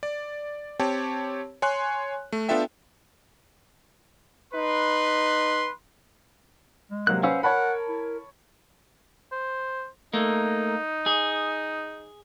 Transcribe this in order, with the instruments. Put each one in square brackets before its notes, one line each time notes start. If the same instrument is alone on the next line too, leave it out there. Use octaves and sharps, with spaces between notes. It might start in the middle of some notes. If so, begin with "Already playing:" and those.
[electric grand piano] D5
C4 G4 C#5 A5
C#5 G#5 C6 F#6
A3
B3 D4 F4 A4 E5 G5
[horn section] D#4 B4 [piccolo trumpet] C6
[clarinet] G#3
[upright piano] C3 F#3 A#3 [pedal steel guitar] F#6
[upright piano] C#4 B4 [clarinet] C5 [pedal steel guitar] F5 F#5 E6
[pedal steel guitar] A#4 [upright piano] C#5 A5 B5 [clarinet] F#5
[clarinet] E4
[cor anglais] C5
[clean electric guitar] A3 A#3 [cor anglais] D#4
[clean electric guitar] G#4